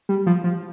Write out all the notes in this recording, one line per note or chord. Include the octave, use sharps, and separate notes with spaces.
G3
F3
F3